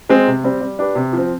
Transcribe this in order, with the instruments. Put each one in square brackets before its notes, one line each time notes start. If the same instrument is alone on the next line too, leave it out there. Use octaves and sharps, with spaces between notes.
[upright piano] G#3 C4
C3
G3 C4
G3
D4 G4 B4
C3
F3
C4